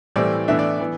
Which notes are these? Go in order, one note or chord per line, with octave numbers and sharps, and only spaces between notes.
A2 E3 G3 C4 D5
A2 E3 B3 D4 E5
D5
E3 B3